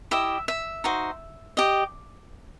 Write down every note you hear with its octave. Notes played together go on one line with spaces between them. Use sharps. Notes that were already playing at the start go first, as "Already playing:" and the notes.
E4 G4 D#5 E5
E5
D#4 F#4 C5
G4 D#5